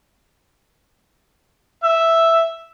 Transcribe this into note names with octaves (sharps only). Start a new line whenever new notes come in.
E5